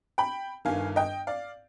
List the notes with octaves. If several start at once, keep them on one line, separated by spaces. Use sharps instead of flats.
G5 B5
G1 G2 D#3 F5 G#5
D#5 G5
D5 F5